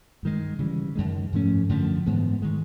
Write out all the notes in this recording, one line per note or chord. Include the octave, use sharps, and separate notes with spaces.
G2 D#3 G#3
C#3 E3 G3
F#2 D#3 G#3
G#2 F3 A3 C#4
F#2 D3 F3 A3
G#2 E3 G#3 B3
D#3 G#3